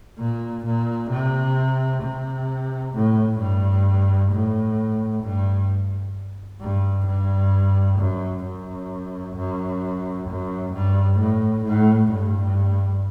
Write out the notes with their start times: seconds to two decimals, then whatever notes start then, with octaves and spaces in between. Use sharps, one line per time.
0.19 A#2
0.65 A#2
1.10 C3
2.02 C3
2.94 A2
3.39 G2
4.32 A2
5.23 G2
6.61 G2
7.07 G2
7.99 F#2
8.44 F#2
9.36 F#2
10.28 F#2
10.73 G2
11.19 A2
11.65 A2
12.11 G2